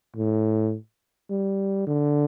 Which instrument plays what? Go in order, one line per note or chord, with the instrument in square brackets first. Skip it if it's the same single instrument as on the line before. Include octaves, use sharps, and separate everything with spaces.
[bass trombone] A2
G3
D3